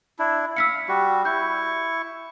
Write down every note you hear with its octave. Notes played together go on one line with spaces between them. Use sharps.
D4 E4
F5 E6 B6 C#7
G3 F#4
E4 C#6 G6